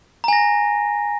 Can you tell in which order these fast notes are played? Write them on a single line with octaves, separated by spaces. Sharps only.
A#5 G#5 A#6